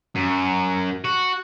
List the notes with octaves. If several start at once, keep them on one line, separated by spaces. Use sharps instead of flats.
F#2
F#4